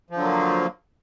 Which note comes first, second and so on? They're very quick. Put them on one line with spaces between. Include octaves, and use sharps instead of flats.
F3 D3 F#3 A#3